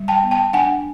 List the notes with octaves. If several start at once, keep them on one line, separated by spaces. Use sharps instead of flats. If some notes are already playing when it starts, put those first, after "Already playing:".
Already playing: G3
G5 A5
B3
G5 A5
D4 F#5 G#5